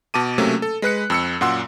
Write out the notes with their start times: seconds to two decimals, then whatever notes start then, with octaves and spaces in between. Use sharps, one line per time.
0.14 B2 A5 D6 D#7
0.38 C3 F#3 A3 A#3 C#4
0.62 A4
0.82 G#3 B4 F#6 C#7
1.10 F2 E6 C#7
1.41 F#2 A#2 F#5 C6 E6